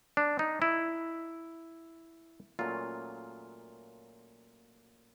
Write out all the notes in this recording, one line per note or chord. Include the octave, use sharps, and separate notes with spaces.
D4
D#4
E4
A#2 F#3 A3 C#4 F4